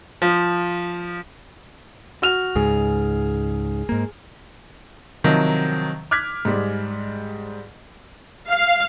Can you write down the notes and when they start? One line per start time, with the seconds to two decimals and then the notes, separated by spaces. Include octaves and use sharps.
0.22 F3
2.22 F#4 F6 F7
2.56 C#2 G#2 G#4
3.89 G#2 A#3
5.24 C3 D#3 F3 F#3
6.11 D6 F6 F#6 G#6 B6
6.45 G#2 G3 G#3
8.49 F5